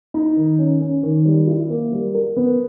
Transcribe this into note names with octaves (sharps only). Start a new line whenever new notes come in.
D#4
D#3
C#4
C#4
D#3
G3
E4
A#3
G3
A#4
B3